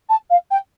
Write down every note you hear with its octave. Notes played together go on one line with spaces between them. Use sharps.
A5
F5
G5